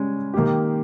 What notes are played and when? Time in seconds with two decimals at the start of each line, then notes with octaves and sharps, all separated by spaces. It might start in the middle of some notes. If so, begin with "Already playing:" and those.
Already playing: C#3 G3 G#3 C#4
0.34 D#3 A#3 D#4 G4